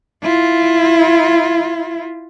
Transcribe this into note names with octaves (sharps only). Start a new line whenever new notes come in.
E4 F4